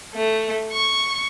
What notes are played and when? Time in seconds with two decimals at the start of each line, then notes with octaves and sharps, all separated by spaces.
0.14 A3
0.72 C#6